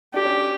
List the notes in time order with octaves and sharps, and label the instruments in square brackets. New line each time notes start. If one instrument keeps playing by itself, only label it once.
[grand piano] D4 [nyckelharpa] G4
[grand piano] C#4